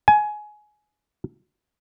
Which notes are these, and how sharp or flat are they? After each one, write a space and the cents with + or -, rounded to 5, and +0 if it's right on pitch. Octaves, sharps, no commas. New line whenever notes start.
G#5 +20